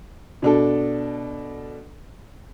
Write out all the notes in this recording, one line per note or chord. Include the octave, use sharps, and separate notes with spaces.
B2 D4 A4